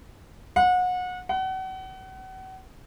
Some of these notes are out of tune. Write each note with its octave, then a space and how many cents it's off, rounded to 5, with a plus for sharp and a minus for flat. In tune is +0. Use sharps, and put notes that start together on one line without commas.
F#5 -30
F#5 +35